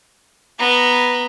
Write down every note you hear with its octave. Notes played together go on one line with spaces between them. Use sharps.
B3 A#5